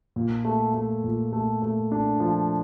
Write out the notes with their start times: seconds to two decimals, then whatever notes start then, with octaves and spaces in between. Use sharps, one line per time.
0.16 A#2
0.45 A3
0.74 A3
1.04 A#2
1.33 A3
1.62 A3
1.92 D4
2.20 F3